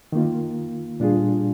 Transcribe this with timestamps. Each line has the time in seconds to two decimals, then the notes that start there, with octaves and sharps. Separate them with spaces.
0.12 D#3 A#3 F4
1.00 A#2 G3 D4 F4 G#4